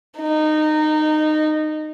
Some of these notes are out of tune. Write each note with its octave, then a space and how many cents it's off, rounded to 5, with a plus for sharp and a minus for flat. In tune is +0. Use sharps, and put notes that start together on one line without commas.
D#4 -20